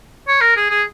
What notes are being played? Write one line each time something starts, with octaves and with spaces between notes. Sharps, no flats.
C#5
A#4
G#4
G#4